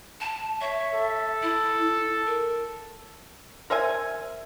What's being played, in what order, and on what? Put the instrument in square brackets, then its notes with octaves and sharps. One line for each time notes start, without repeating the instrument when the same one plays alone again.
[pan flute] A5
[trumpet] C#5 [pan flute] E5
[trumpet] A4
[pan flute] E4
A#4
[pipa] A#4 C5 E5 G#5